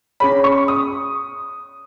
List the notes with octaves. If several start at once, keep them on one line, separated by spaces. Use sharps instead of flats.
C#4 G#4 C#5 B5
C#6
D#6